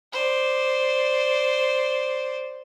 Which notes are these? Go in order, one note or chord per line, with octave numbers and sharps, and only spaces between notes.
C5 D5